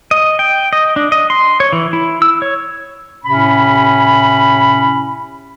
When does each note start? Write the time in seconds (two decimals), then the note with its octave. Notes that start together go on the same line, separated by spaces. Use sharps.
0.11 D#5
0.39 G5
0.73 D#5
0.96 D4
1.12 D#5
1.30 C6
1.60 C#5
1.73 E3
1.93 E4
2.22 E6
2.42 C#5
3.24 A2 C3 C#4 B5